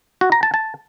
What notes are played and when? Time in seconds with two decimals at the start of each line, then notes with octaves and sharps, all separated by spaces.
0.21 F#4
0.32 A#5
0.43 A5
0.54 A5